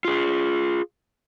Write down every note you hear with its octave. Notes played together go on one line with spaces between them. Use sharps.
F4 G#4